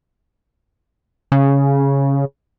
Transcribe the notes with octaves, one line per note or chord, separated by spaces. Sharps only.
C#3